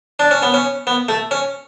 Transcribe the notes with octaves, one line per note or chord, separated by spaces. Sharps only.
D4
C#4
B3
C#4
B3
A3
C#4